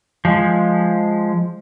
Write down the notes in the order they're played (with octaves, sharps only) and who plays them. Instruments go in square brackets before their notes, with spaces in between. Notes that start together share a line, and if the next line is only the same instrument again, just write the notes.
[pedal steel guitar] F3 G#3